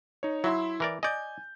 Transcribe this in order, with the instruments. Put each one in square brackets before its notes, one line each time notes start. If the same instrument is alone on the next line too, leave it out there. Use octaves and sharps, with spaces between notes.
[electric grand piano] D#4 C#5
[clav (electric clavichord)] F#3 [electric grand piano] E4 E5 C6
[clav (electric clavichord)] E3 A#4 D5
[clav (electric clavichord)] D5 D#5 [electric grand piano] G#5 G6